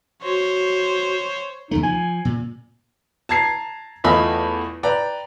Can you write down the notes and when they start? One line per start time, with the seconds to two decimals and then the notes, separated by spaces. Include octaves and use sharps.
0.23 F#4 C5 C#5
1.71 D#2 C#3 A3 D#4
1.83 F3 G#5
2.25 A#2
3.29 A5 A#5 G#6 C7
4.04 E2 A3 F4 D#5 G#5 B5
4.83 B4 D5 G5 A#5